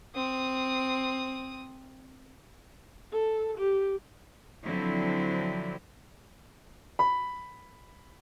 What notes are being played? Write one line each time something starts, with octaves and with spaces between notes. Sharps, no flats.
C4 D#6
A4
G4
D3 F3 F#3 C4 E4
B5